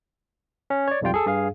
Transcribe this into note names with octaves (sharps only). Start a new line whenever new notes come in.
C#4
C#5 D5
B1 F2 G3 F4 G5
G#4 A4
G2 G#4 F5